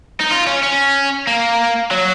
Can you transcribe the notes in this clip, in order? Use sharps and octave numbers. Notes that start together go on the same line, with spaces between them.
D#4
F4
C#4
C#4
A#3
F#3